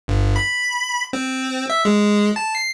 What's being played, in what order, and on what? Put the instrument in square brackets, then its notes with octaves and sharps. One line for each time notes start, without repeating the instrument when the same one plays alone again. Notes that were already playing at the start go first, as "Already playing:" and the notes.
[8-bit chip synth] G1
B5
C4
E5
G#3
A5
C7